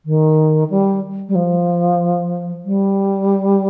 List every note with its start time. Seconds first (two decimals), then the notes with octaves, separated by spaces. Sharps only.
0.05 D#3
0.70 G3
1.29 G3
1.35 F3
2.65 G3